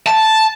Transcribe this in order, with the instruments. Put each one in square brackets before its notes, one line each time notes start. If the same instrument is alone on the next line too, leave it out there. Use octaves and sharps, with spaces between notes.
[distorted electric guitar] A5